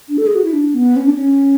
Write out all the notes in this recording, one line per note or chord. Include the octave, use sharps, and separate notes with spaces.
D4
A4
G#4
F#4
E4
D4
B3
C#4
D4
C#4